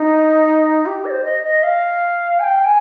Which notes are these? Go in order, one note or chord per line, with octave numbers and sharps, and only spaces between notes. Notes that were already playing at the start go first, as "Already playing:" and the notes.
Already playing: D#4
G4
D#5
C5
D#5
D#5
F5
G#5
G5
G#5